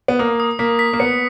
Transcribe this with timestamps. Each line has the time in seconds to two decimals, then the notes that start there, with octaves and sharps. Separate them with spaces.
0.08 B3
0.19 A#3 D#6
0.40 D#6
0.59 A#3 B6
0.79 B6
0.93 A#3
1.00 B3 C#7